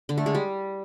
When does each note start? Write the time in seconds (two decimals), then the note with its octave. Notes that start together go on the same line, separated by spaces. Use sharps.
0.09 D3
0.18 A3
0.26 G#3
0.35 G3